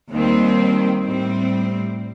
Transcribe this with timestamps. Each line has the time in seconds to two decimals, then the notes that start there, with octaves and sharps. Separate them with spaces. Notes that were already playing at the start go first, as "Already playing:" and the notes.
0.11 D#2 D#3 G3 C4
1.03 A2 G3 C4